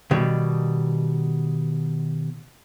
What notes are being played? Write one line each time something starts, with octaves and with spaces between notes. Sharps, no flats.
B2 D#3 G3